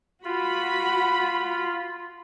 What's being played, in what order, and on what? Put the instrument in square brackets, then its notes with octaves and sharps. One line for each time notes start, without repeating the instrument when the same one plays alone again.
[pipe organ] F4 [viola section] F#4 B5